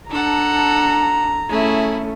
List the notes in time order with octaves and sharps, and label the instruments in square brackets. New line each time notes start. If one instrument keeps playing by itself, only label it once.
[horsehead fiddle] D4 [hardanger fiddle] A4 F#5 [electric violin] A#5
[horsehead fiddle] A3 C#4 [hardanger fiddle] E4 G#4